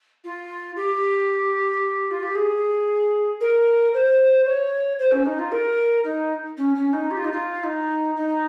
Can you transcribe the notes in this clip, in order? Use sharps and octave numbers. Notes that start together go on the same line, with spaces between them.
F4
G4
F4
G4
G#4
A#4
C5
C#5
C5
C#4
D#4
F4
A#4
D#4
C#4
C#4
D#4
G4
F4
D#4
F4
D#4
D#4